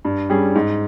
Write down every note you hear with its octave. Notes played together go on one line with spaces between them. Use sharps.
G2
G3 C#4 G#4
G#2